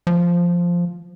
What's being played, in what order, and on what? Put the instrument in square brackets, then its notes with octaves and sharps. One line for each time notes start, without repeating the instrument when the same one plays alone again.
[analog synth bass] F3